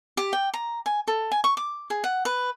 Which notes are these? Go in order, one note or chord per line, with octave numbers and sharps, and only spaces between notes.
G4
G5
A#5
G#5
A4
G#5
C#6
D6
G#4
F#5
B4